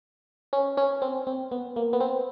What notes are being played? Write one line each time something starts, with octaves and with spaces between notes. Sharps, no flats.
C#4
C#4
C4
C4
B3
A#3
B3
C4